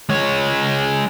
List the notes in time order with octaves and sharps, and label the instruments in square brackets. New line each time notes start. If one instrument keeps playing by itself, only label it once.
[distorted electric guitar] G#3 C#5